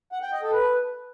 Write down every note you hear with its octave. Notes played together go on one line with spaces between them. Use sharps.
F#5
G5
D#5
A4
B4